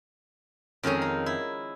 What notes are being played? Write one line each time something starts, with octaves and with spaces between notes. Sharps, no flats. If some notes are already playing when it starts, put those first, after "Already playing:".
F2 D#3 G#3 C#4 G#4 A#4
D#4
E4